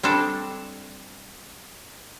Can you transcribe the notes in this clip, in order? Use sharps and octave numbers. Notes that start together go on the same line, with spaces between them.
G3 C4 D4 A4